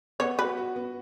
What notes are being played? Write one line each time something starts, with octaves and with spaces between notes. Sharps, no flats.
B3 C#5
F#4 B4
F#4
B3